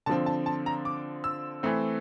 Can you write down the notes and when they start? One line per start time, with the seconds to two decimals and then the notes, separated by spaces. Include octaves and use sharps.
0.06 D3 F3 C4 A5
0.26 A5
0.46 A5
0.66 A#5
0.85 D6
1.24 E6
1.63 E3 A3 C4